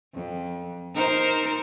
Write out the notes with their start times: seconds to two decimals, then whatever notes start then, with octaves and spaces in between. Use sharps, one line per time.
0.14 F2
0.94 D#4 A#4 C5